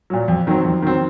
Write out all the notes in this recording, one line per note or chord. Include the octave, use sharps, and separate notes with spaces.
A#2 F#3
F2
D#3 F#3 C4
F2
D#3 F#3 C4